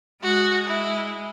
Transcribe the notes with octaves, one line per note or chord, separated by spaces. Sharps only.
G#3 F#4
E4